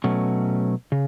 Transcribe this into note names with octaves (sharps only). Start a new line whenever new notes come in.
B2 F#3 A3 C#4
C#3